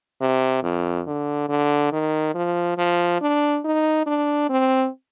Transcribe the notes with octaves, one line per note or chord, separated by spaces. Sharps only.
C3
F2
D3
D3
D#3
F3
F3
D4
D#4
D4
C4